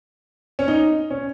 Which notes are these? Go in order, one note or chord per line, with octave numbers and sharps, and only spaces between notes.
C#4
D#4
C#4